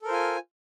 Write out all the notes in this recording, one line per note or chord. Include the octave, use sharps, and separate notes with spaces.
F4 A4 A#4 C5 G#5